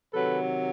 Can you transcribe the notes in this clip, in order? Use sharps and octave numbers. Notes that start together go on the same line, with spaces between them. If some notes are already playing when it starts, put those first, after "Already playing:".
C3 D#3 F#3 A4 B4